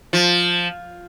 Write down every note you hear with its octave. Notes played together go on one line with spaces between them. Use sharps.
F3